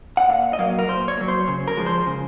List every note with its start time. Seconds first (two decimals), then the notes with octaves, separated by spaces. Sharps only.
0.17 F#5
0.29 A#2 F5
0.53 D#5
0.59 F#3 A#3 F5
0.79 A#4
0.88 A#2 C5
1.08 C#5
1.17 F#3 A#3
1.28 C5
1.48 C#3
1.68 A#4
1.77 F3 G#3
1.86 C5
2.07 C#3